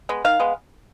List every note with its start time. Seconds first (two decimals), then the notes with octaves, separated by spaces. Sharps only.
0.09 G#3 B3
0.24 D#3 F5
0.40 G#3 B3